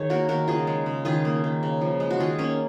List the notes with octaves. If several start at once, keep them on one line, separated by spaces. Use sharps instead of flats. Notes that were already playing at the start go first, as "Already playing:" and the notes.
Already playing: D#3 G#4 C#5
A#3 F#4 A#4
D#3 F#4 A#4
C#3 F4 G#4
G#3
C#3
D#3 F4 G#4
A#3
D#3
C#3
F3
G#3
F#4
D#3 F4 G#4
A#3 C#4